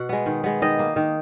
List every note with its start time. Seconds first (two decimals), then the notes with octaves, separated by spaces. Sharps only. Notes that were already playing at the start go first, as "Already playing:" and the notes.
Already playing: B2 F#5
0.09 G#3 B3
0.26 D#3
0.44 G#3 B3
0.62 D#3 D#5
0.79 A#3
0.96 D#3